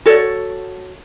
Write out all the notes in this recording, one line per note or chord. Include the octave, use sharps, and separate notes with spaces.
F#4 A4 C#5 D5